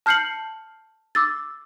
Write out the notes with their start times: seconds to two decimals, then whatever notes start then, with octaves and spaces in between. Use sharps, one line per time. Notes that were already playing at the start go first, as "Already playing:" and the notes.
0.06 A5 F6 G6 C7 C#7 F#7
1.15 D6 E6 A6